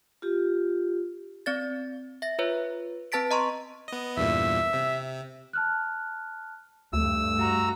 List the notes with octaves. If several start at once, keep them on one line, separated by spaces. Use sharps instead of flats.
F4 G4
C4 D5 A6
E5 A#6
F4 B4 C#5
C4 B4 A5 A6 B6 D7
D#5 A#5 C6 C#6
B3 D#5
E2 G2 A#2 E5
C3
A5 F6 F#6
D2 G2 A3 E6
F#4 A#5